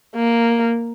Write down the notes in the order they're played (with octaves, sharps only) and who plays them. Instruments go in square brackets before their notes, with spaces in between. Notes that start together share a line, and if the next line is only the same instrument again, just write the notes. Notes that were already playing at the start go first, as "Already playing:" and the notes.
[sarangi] A#3